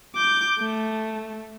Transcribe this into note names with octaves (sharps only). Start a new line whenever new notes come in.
D6 G6
A3